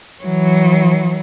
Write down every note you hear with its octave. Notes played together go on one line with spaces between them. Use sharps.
E3 F#3